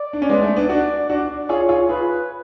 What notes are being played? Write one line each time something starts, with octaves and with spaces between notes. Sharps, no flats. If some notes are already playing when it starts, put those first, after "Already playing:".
Already playing: D5
D4
C#4
G#3 B3 D5
A3
B3 D4
D4 F#4 D5
D4 F#4 D5
F4 G#4 C#5
F4 G#4
F4 G#4 B4